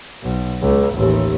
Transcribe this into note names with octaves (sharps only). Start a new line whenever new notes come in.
B1
C#2
A1 D#2